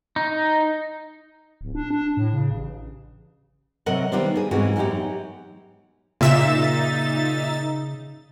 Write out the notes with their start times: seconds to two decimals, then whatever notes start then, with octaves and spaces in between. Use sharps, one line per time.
0.16 D#4
1.61 D1
1.75 D4
1.90 D4
2.17 A2
2.33 C#3
2.51 A1
3.86 C3 F#3 A#4 D#5 F#5
4.12 D#3 G3 B3 D4 C5
4.35 A#3 G#4
4.51 G#2 B2 E3 A#3 C4 F#4
4.76 F#2 E3 C4 D#4 G4 F#5
6.21 A#2 C#3 D#4 E5 A6 E7